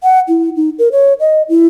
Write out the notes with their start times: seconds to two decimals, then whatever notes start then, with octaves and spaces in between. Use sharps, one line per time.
0.03 F#5
0.28 E4
0.56 D#4
0.79 A#4
0.92 C#5
1.20 D#5
1.49 E4